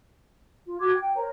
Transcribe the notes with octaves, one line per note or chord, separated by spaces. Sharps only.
F4
F#4 D6 G#6
G5
A#4 C5 C#5 A#5